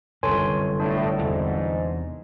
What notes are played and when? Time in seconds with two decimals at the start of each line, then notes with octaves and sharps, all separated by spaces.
0.23 G1 F#2 C3 A4 C#5 G#5 C6
0.80 A2 D4
1.19 E2 G#2 C3 E3